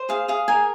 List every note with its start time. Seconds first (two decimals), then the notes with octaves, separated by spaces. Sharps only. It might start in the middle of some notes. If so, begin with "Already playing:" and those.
Already playing: C5
0.09 G#4 F5
0.28 G#4 F5
0.48 A#4 G#5